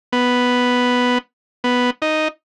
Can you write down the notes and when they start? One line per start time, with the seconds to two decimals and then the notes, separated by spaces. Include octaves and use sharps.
0.13 B3
1.64 B3
2.02 D#4